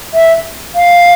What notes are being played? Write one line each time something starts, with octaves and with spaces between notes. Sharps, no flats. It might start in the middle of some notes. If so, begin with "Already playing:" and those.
E5
F5